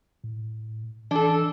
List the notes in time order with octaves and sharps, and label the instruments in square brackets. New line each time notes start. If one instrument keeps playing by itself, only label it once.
[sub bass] A2
[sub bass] E3 [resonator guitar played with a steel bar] D4 A4